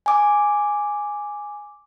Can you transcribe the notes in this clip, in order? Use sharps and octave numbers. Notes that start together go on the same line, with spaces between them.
G#5 D6